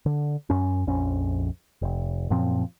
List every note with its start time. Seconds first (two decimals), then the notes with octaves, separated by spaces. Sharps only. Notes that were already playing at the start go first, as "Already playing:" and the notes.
0.06 D3
0.50 F#2 C#4
0.87 A#1 F2 C#4
1.82 F1
2.30 F#2 A#2 F3 C4